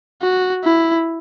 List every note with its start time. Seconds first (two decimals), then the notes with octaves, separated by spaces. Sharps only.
0.22 F#4
0.64 E4